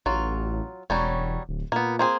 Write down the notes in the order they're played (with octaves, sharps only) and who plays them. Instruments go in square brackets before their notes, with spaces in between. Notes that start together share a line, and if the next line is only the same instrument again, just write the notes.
[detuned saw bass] A1 [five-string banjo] F#3 F4
[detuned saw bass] E1 [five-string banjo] F#3 G3 C#4
[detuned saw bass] D1
[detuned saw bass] A#2 [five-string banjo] A#3 B3
[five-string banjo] A#3 C4 G#4